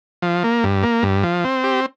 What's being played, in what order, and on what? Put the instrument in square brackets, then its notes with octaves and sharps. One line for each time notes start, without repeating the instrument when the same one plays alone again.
[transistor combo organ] F3
A#3
G2
A#3
G2
F3
C4
G4